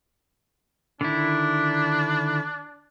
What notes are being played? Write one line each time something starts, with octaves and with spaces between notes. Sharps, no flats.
D3 D#3 D4 E4